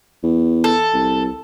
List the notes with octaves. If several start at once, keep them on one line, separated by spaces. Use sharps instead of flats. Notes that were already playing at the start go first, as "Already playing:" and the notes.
E2
A4
C2